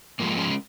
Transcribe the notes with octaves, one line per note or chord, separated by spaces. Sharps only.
G#2 F3 G#3 A#3
G#3 C#4